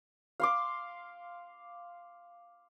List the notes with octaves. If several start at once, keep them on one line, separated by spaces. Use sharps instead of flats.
F5 C6 D6